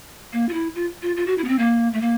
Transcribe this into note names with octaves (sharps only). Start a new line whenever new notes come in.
A#3
F4
E4
F4
F4
F4
F#4
E4
B3
C4
A#3
A3
A#3